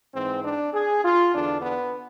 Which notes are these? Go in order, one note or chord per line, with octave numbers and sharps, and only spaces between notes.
G#2 E3 C4
D4
G#4
F4
E2 D3 D4
B3